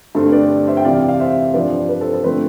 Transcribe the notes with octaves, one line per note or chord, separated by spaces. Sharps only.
G2 D3 A3 C4 A4 C5
B4 D5
C5 E5
G5
F2 C3 E3 D5 F5
F5
C5 E5
G2 F3 C4 B4 D5
B4
A4 C5
A4 C5
D3 F3 A3 C4 B4